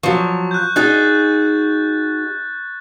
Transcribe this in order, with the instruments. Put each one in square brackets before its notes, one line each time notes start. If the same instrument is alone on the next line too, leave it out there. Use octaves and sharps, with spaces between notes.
[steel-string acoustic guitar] F3 F#3 [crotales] C#6
[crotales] F#6 G6
[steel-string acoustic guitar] D#4 F#4 G#4 [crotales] F#6 A6